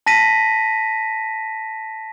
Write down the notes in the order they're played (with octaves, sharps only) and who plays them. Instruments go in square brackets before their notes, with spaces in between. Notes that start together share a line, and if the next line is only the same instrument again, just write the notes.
[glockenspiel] A5 A#6 B6 D#7